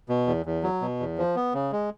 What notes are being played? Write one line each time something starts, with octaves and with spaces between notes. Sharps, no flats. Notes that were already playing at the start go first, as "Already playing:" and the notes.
B2
E2
E2
F#3
B2
E2
F3
B3
C#3
G#3